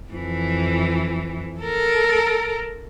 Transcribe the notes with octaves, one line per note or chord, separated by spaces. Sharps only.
F2 E3
A4 A#4